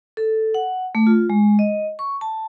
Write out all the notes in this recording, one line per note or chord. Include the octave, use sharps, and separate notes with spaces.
A4
F#5
A3
F4
G#3
D#5
C#6
A5